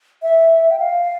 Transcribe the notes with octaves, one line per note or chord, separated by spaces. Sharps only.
E5
G5
F5